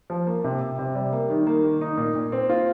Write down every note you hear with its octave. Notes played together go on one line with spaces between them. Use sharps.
F3
A#3
C3
C3
C3
G3
A#3
D#3
A#3
D#3
D#4
A#2
A#2
C4
F4